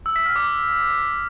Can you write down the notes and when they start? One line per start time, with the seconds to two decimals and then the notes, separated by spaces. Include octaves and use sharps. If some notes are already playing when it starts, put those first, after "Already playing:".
0.06 E6
0.16 B6
0.26 F6
0.36 D6